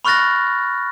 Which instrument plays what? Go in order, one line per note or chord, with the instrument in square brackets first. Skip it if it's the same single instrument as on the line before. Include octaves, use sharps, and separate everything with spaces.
[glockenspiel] B5 C#6 F6 F#6 A6 A#6